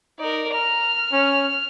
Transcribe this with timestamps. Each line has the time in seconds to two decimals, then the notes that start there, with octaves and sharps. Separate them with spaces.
0.20 D#4 A#4 D5
0.53 A#5 F6
1.12 C#4